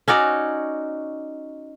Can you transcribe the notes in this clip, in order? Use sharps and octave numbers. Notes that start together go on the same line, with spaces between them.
C#4 D#4 F#4 D5